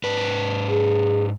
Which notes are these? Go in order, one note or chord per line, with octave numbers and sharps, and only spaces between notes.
G#2 B4
G#4